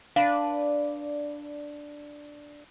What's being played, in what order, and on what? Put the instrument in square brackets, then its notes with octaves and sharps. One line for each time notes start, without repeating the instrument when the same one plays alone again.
[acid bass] D4 [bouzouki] B4 D5 [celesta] F5